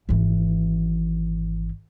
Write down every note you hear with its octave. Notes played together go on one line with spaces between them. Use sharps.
G#1 E3